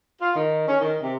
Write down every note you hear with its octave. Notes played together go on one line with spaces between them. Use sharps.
F4
D#3
C#4
D#3
C3